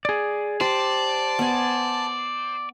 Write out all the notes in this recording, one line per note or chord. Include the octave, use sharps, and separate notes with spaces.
G#4 D5
G4 C5 D5 A5
B3 G#5